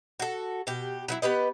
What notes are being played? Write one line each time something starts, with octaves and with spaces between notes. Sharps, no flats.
F#4 A4
B2 G4
D3 F#3 E4
B3 G4 B4 D#5